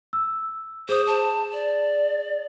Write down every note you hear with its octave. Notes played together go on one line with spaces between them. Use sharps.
E6
G#4 C5 D#6
A5
D5